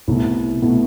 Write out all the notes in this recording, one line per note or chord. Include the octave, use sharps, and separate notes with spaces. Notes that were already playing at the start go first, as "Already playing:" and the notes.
C2 B2 A3 E4
B2 A3 E4